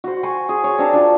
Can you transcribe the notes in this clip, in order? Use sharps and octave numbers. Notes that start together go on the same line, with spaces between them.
F#4 C5
G#5 C6 C#6
G#4
C#5
C4 D4 A#4 A5
D4 F4